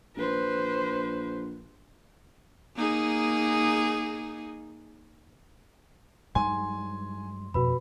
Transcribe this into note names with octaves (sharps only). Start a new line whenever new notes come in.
A#1 B4 C5
A#3 D#4 G#4
G2 F#3 G#3 D#4 G#5 C6
F2 B2 F#4 B4 B5